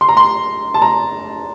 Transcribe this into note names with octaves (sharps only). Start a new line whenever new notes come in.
C6
A#5
C6
A5
A#5